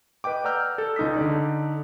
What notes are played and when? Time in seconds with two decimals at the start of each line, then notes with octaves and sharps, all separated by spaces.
0.24 B4 D#5 G5 D6
0.44 D5 F#5 A#5 E6 F6 G6
0.78 A4
0.96 C#2 D#4 D#6 B6
1.17 D3 D#4 D5